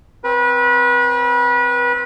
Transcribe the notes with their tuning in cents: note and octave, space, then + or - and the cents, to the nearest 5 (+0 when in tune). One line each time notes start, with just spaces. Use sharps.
C4 +0 B4 -30